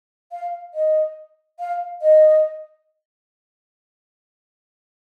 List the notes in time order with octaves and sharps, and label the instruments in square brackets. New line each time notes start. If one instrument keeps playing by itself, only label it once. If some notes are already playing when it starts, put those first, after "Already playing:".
[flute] F5
D#5
F5
D#5